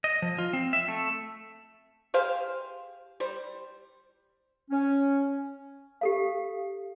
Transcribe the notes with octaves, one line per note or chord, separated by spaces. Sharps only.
D#5
F3
F4
C4
E5
A3
G4 G#4 C5 F5
G3 C5
C#4
G4 A4 F5